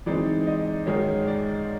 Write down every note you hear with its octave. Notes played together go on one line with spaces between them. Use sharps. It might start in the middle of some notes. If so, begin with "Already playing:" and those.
E3 G#3 C4 D#4 D5
D#5
G#2 D#3 G#3 C#4
D5